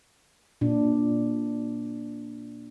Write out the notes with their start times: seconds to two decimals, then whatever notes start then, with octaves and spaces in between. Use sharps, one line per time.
0.61 A#2 D4